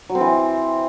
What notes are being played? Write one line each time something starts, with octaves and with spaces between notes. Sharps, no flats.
F#3
C4
E3